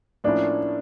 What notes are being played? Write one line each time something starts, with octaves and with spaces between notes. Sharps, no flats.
A2 F3 A#3 C#4 D4 E4